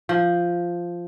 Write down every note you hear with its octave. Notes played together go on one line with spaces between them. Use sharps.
F3